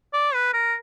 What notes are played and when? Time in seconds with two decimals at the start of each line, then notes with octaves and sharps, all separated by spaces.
0.13 D5
0.34 B4
0.53 A#4